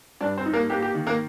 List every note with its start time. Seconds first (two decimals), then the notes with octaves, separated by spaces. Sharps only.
0.21 G2 D4 D5
0.37 C4 C5
0.46 D#4
0.53 A#3 A#4
0.70 A#3 G4
0.82 G4
0.95 D#3
1.07 A#3 A#4